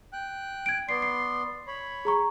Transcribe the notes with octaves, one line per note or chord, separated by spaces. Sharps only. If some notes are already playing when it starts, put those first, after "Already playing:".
G5 F#6
G#6 D7
B3 D5 C6 C7
C7
C#5 B5
G#4 A#5 C#6